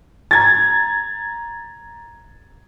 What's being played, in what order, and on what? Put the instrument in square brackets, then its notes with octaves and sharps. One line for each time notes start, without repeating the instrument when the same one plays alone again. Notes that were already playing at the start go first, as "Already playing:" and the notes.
[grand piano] A#5 G#6 A6